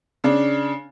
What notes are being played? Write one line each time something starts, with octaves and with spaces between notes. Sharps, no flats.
C#3 D4